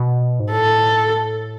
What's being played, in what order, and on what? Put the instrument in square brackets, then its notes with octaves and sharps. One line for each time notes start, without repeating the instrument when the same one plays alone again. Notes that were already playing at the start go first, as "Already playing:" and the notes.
Already playing: [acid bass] B2
G#2
[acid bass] A2 [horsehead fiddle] A4